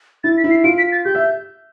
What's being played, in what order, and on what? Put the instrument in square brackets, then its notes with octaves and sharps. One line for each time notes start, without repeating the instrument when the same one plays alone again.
[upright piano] E4 [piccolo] A6
[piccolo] B6
[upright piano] E4
[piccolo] C7
[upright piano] F4 [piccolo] D7
[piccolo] B6
A6
[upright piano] G4 [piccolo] G6
[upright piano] E5